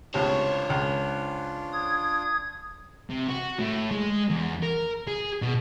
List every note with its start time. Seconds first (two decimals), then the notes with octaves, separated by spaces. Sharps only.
0.14 C#2 A2 C3 D4 F4 C5 C#5
0.70 C#2
1.73 D#6 G#6
3.10 C3
3.28 F#4
3.59 A2
3.91 G#3
4.31 E2
4.63 A#4
5.07 G#4
5.42 B2